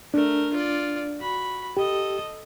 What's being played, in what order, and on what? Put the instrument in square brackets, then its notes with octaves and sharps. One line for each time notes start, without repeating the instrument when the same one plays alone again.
[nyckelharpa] A3 A#4 [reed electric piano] D4
[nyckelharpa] F4 D5
F#4 B5
[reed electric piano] G4 [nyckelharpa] A4 D#5